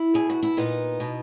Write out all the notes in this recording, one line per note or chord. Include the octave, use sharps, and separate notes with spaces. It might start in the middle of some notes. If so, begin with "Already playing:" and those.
Already playing: E4
B2 G#4
F#4
E4
A#2 B3 D#4
B2